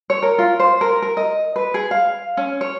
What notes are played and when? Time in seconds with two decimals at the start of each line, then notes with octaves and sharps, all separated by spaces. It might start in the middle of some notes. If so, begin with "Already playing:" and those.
0.10 C#5
0.22 A#4
0.38 F4
0.59 C5
0.81 A#4
1.02 A#4
1.17 D#5
1.56 B4
1.74 G#4
1.91 F5
2.37 C#4
2.61 C#5